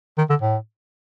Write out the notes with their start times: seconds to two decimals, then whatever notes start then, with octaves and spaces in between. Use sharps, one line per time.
0.18 D#3
0.30 D3
0.42 A2